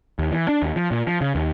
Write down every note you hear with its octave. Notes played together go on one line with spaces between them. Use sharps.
D#2
E3
D4
D#2
F3
A#2
F3
C#3
D#2